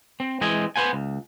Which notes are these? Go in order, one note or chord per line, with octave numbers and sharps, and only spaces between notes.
C4
E3 G#3 C4 D#5 G#5
B3 B4 C5 F#5 G#5
C#2